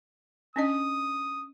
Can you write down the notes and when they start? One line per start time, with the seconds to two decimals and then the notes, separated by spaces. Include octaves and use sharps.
0.56 C#4 D4 D#5 D#6